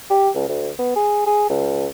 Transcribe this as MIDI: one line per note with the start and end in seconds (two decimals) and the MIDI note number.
0.10 0.29 67
0.35 0.48 37
0.49 0.70 38
0.79 0.96 59
0.96 1.25 68
1.27 1.45 68
1.50 1.86 37